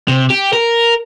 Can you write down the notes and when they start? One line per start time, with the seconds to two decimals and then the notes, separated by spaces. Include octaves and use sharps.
0.08 C3
0.30 G4
0.53 A#4